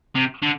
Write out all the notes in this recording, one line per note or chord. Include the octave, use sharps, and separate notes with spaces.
C3
D3